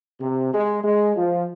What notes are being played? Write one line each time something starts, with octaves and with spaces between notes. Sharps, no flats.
C3
G#3
G#3
F3